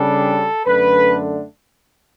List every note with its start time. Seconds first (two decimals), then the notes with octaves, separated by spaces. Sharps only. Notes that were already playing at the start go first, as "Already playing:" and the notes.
Already playing: C#3 G3 D4 A4
0.65 F#2 D3 A3 D4 B4